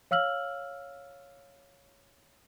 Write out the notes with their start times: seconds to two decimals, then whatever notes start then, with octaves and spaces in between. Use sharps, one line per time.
0.11 C#5 F5 E6 F6 F#7